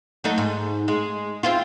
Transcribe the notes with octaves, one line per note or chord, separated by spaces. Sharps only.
F#3 A3 D#4
G#2
G#3
C4 E4 F4